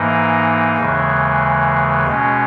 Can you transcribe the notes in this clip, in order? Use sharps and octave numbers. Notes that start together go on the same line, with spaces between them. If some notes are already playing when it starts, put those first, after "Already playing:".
Already playing: G#2 E3 A#3 D#4
D#2 C#3 E3 G#3
B2 G#3 C#4